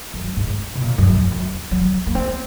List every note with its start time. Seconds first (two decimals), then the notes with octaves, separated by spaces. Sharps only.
0.14 F#2
0.37 G#2
0.75 C3
0.81 A#2
0.98 F#2
1.15 F2
1.32 F#2
1.71 F#3
2.06 A#3
2.15 C4